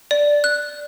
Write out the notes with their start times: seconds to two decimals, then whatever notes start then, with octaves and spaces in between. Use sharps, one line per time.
0.11 D5
0.44 F#6